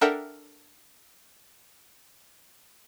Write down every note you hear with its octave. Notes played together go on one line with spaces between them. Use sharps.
D4 A4 A#4 E5 F#5 G5